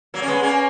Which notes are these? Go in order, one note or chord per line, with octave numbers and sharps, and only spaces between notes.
F#3 A#3
C#4
G#3 B3
A#3 C#4